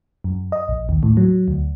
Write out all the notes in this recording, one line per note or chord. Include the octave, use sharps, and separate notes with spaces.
F#2
D#5
A#1
D#2
A2
F#3
D2